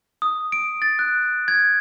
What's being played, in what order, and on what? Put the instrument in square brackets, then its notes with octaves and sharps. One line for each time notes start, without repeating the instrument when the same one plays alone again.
[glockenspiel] D#6
D7
A6
F#6
G#6